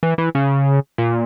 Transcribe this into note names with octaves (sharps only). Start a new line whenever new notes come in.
E3
E3
C#3
A#2